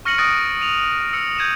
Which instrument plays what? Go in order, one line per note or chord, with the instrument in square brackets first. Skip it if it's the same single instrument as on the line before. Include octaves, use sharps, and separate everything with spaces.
[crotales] C#6 F6 A#6 C#7 D#7 F#7
D#6 F#6 A6 A#6 D7
D#7 F7
E6 C#7
G6 G#6 D#7 E7